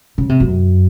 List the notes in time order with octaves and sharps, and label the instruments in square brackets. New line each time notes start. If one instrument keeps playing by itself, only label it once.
[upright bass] C#3
C3
F#2